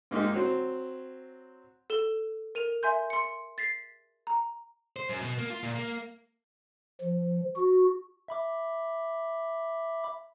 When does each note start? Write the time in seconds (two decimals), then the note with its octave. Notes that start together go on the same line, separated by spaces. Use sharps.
0.11 G#2 A#3 D#4 F4 G4
0.34 F#3 C4
1.90 A4 E7 G7
2.55 A#4 D#7 F7
2.83 E5 G#5 C6 G6
3.10 C6 C#7
3.58 A6 B6 C7
4.27 A#5
4.96 C5
5.09 F#2
5.21 B2
5.38 A#3
5.50 F4
5.63 A#2
5.75 A#3
7.01 F3
7.56 F#4
8.28 E5 B5 D6